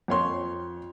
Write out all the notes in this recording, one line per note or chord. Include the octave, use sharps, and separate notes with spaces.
F2 C#5 C6